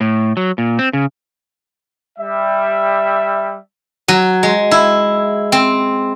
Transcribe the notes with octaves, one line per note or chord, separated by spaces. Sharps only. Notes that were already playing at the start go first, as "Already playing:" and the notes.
A2
F#3
A#2
C4
C#3
G3 E5
F#3
G#3
E4
C4